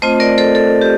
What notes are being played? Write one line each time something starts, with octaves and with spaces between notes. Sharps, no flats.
A3 C4 F4 C5 D#5
A#4 D5
A4 C5
A4
G4